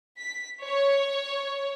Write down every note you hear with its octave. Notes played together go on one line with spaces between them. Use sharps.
B6
C#5